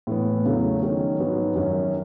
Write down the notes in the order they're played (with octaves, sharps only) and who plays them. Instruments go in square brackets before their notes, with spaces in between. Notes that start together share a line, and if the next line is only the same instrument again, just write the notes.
[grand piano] A2 E3 B3
E2 C#3 F#3 A3
D#3 F#3 C#4
G#2 F#3 B3 F#4
F#2 D#3 F#3 C#4